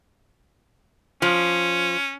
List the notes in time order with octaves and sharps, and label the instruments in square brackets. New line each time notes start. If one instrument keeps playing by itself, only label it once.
[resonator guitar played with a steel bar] F3 [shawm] C#4